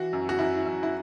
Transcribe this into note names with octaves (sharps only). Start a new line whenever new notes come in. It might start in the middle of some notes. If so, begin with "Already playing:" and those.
Already playing: E3 F#4
F#2
F#4
F#2 E4
F#2
E4